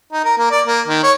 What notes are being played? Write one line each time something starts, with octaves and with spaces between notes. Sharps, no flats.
D#4
A#4
A#3
D5
A#3
D#3
C#5